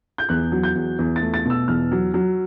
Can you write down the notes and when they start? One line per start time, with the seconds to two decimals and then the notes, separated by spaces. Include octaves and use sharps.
0.18 G6
0.29 E2 F#6
0.52 F#3
0.64 G6
0.75 E2
0.99 E2
1.16 A6
1.22 A3
1.34 A6
1.45 B2 E6
1.68 E2 F6
1.92 F#3
2.14 F#3